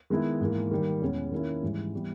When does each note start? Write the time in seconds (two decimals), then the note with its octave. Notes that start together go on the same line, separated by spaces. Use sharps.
0.10 D#3 G#3 B3 E4
0.41 G#2 E3 A#3
0.71 D#3 G3 A#3
1.02 E2 B2 G#3 C#4
1.32 D#3 A#3 C#4 E4
1.62 G#2 E3 G3
1.94 E3 G3 B3